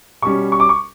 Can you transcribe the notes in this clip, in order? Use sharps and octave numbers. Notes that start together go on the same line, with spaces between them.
B2 G3 C#4 C#6
C#6
D6
C#6